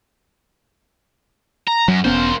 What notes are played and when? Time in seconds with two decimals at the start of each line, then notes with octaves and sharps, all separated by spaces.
1.68 A#5
1.88 F#2 F#3
2.05 E1 A#3 B3 C#4 C5